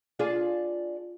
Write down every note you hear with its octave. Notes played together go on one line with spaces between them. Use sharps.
D4 F4 G#4